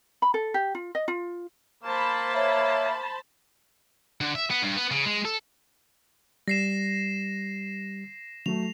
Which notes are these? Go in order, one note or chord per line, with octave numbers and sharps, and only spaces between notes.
B5
A4
G4
F4
D#5
F4
A#3 C5 A5 B5
C#5 E5
D3
E5
B3
G2
B3
C#3
G#3
A4
G3 A#6 C7 E7
F#3 A3 F7